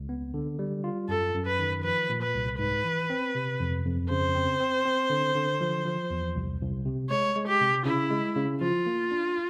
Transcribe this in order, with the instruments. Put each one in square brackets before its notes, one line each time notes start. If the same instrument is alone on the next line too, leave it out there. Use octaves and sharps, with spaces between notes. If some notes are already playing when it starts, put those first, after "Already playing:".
Already playing: [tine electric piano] C#2
B3
D3
G3
F4
[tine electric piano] F#2 [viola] A4
[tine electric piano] F#2
[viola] B4
[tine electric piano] D#3
[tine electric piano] F3 [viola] B4
[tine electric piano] A#2
[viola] B4
[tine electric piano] C2
[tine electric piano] G#2 [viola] B4
[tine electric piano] E3
C4
C3
F2
F2
[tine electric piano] C#3 [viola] C5
[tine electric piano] C4
C4
C4
D3
D3
F3
F3
E2
C2
C2
C3
[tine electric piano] G#3 [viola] C#5
[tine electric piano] G#3
[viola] G4
[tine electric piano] C3
[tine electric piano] C#3 [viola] E4
[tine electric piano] G#3
C#3
[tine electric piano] F3 [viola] F4
[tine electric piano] A#3
D4